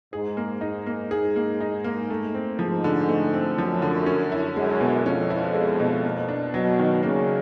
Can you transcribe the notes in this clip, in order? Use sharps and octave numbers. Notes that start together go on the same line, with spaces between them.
G#2 G#4
A#3
G#2 D#4
A#3
G#2 G#4
A#3
D#4
A#3
A3
C4
G#2 F3
D3
A3
C4
F#2 F3
D3
C#4
E4
F#2 G#3
B2
F2 C#4
E4
G#3
B2
A#3
D4
B2 F#3
D#3
C#3 A#3